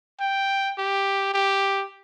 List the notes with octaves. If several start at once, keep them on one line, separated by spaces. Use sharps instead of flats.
G5
G4
G4